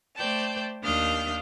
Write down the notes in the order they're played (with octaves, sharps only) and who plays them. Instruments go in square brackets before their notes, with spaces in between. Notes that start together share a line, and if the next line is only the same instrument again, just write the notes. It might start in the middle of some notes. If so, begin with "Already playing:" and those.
[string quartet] A3 C5 D5 G5 A5
D#2 D4 F5 D#6 F6 G6